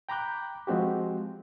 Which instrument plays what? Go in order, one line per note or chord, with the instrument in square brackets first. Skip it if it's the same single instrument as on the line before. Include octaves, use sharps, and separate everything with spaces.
[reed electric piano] G5 A#5 B5 D6 F#6 G6
F3 G#3 C4 F#4 G4